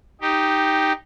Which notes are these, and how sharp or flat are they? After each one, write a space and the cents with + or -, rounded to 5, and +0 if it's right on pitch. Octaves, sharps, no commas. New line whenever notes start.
D#4 +0 G4 +0